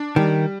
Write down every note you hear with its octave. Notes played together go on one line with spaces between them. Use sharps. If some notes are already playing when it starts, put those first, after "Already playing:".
Already playing: D4
D#3 G3